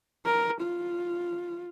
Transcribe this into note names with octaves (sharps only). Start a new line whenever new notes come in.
A#4
F4